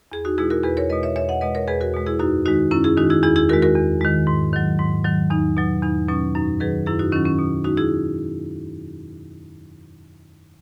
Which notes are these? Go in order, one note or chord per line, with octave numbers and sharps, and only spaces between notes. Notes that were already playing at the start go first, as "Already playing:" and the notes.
E2 G#4
D#4 F#4
B2 G#3 E4 G#4
F#4 A#4
E2 G#4 B4
A#4 C#5
B2 G#3 B4 D#5
C#5 E5
E2 C#5 E5
D#5 F#5
B2 G#3 B4 D#5
A#4 C#5
E2 G#4 B4
F#4 A#4
B2 G#3
E4 G#4
F#2 D#4 F#4
D#3 G#3 D#4 F#4
F#2 C#4 E4
E4 G#4
D#3 G#3 D#4 F#4
E4 G#4
E2 E4 G#4
E4 G#4
D#3 G#3 F#4 A#4
F#4 A#4
E2
D#3 G#3
G#2
D#3 F#3
G#2
D#3 F#3
E2 D#4
B2 F#3
E2 D#4
B2 F#3 C#4
F#2 D#4
D#3 F#3 G#4 B4
F#2 E4 G#4
D#4 F#4
D#3 F#3 C#4 E4
C#4
B2
G#3 D#4 F#4
E4 G#4